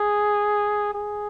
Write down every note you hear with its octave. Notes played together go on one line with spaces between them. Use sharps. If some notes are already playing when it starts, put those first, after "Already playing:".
Already playing: G#4
G#4